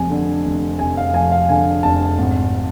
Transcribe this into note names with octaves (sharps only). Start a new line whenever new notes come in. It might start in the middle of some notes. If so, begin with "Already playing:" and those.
Already playing: F1 F2 G#5
D3
F1
F1 G#5
F5
F2 G#5
F5
D3 G#5
F1 A5
G#1